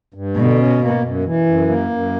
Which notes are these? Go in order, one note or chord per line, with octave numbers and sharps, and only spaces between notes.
G2
B2 D3
C#4
A#3
F#2
E3
F#2
A#3
F#2